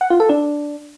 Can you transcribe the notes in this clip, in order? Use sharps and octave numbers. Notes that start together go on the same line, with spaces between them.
F#5
F4
A4
D4